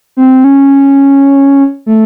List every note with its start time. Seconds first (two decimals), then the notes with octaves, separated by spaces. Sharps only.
0.17 C4
0.44 C#4
1.86 A3